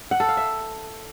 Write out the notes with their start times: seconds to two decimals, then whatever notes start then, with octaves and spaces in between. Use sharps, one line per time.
0.11 F#5
0.20 A4
0.29 F5
0.37 E5